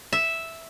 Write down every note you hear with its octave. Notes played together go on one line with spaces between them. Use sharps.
E5